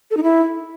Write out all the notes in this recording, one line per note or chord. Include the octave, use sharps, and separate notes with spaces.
A4
D#4
E4